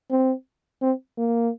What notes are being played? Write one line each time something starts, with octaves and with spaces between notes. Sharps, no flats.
C4
C4
A#3